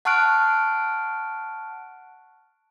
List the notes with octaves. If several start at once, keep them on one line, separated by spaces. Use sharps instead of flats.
F#5 A5 C#6 F6 F#6 D7